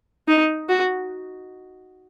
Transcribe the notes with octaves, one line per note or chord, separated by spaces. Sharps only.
D#4
F#4